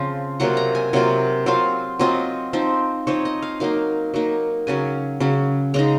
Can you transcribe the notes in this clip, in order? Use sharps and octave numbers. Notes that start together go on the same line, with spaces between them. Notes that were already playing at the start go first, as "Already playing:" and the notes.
Already playing: C#3 F3 C4 F4
C3 F#3 A#3 F4 F#5
A#5
G#5
C3 F#3 A#3 F4
F#3 C4 F4 F5
F#3 C4 F4 D#5
F3 C4 D#4
F3 C4 D#4 C#5
D#5
F5
F#3 A#3 D#4 F5
F#3 A#3 D#4
C#3 F#3 C#4 G#5
C#3 F#3 C#4
C#3 G#3 D#4 A#5